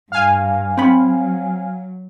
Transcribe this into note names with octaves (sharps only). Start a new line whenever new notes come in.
G2 F5 G#5
F#3 C4 B5